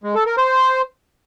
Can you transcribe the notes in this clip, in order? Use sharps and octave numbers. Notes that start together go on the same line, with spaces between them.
G#3
A4
A#4
C5